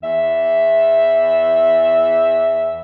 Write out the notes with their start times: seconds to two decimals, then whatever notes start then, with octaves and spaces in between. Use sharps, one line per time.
0.02 E2 E5